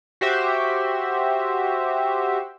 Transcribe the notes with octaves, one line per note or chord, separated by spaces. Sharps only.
F#4 G4 C5 E5